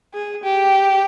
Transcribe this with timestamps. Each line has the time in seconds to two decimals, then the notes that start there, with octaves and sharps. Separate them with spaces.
0.14 G#4
0.43 G4